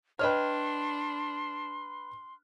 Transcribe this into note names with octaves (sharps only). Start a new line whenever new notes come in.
D4 B4 C#5 D#5 G5 C6 F6